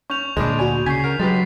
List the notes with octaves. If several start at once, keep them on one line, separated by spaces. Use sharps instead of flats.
C#4 C#6 G6 F7
D2 A#2 G#3 C#4 D4 G#5 B5
F#4 D5 G#5 B5
C#3 G#5 C#6 G6 G#6 B6 C7
A#4 F#5
F#3 G#3 G4 B4 A6 B6